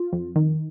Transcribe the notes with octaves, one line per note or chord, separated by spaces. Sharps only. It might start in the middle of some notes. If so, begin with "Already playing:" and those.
Already playing: F4
F2
D#3